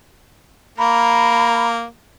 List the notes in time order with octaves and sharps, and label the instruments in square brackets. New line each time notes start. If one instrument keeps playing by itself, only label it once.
[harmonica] A#3 [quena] A#5 [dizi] B5